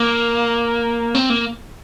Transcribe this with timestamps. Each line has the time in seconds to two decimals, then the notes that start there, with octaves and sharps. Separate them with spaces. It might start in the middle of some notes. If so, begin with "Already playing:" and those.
Already playing: A#3
1.15 C4
1.30 A#3